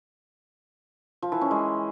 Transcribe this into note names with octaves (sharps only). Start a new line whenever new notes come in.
F3
E3
C#4
G#3